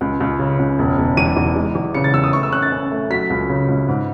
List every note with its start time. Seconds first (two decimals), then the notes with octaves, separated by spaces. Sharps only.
0.01 C#2
0.20 C#2
0.39 C#3
0.59 C#2
0.79 E1
0.98 E1
1.17 E2 D#7
1.37 E2
1.56 G#3
1.75 E2
1.95 C#3 C#7
2.04 A6
2.13 E2 E6
2.24 D#6
2.33 A3 C#6
2.43 E6
2.53 C#4 F#6
2.62 A6
2.72 C#4
2.91 A3
3.10 F#3 B6
3.30 C#2
3.49 C#3
3.68 C#2
3.88 G#2